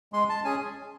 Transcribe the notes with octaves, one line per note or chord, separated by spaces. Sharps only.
G#3 C6
A5
C#4 G#4 G#5